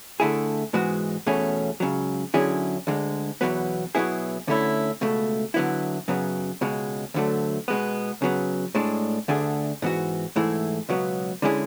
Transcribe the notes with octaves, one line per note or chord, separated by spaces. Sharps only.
D3 A3 E4 G#4
G#2 E3 G#3 B3 F#4
E2 B2 A3 C#4 G#4
C#2 C#3 F#3
D3 F#3 C#4 E4 G#4
D2 D3 G#3
E2 B2 F#3 B3
B2 F#3 B3 E4 G#4
D2 D3 A3 C#4 E4
C#2 B2 A3
D3 F#3 B3 E4
F#2 C#3 F#3 B3
C#2 B2 G#3
D2 D3 F#3 A3
B2 G#3 B3
C#3 F#3 B3
A2 G#3 D4
D2 D3 A3 D4 G#4
G#2 E3 B3 F#4
G#2 E3 A3 E4 G#4
C#2 B2 F#3 B3
D3 G#3 C#4 E4 G#4